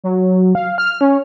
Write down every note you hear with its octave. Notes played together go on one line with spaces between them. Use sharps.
F#3
F5
F6
C#4